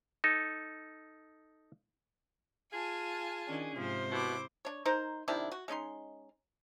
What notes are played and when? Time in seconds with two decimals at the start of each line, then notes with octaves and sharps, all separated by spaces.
0.24 D#4 A4
2.73 F4 G#4 G#5 A5
3.47 D#3 C#4 D4
3.76 G#2 C3 F3 C5
4.11 B2 E4 D6
4.65 D4 C#5
4.85 D#4 A#4 C5
5.28 C3 D#3 D4 E4
5.52 F#4
5.68 G#3 C#4 D#4 C6